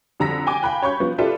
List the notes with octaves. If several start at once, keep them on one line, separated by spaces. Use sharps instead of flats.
F2 D3 A#5 E6 A#6 B6
G5 G#5 D6
F5 G5 G#5 B5 F#6
C#5 B5 C#6 G6
F3 B3
F4 G4 A4 B4 D5 E5